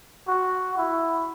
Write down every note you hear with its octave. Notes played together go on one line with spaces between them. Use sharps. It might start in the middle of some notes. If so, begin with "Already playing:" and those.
F#4
E4